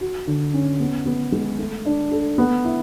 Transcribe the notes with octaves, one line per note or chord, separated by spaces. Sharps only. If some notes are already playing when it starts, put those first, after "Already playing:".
F#4
D3
C#4
B3
B3
G#3
A3
D4
A4
B3
E4